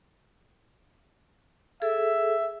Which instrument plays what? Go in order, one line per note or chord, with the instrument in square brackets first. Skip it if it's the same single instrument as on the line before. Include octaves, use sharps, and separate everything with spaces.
[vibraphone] G#4 A4 [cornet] E5